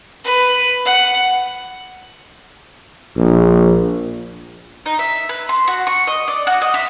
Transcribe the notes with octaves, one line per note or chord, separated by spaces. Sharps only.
B4
F#5
A#1
D#4
E5
B4
C6
F#4
C#6
D#5
D5
F#4
D#5
E5